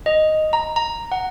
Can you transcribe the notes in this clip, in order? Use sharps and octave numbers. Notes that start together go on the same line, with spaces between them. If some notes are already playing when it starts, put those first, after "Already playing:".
D#5
A#5
A#5
F#5